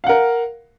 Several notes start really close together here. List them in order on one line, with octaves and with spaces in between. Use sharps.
F5 F#5 A#4